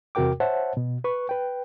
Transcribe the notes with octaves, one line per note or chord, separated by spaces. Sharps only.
E2 C3 F#4 A#4 G5 D6
C5 C#5 E5 F#5 A5
B2
B4 C#6
B4 G5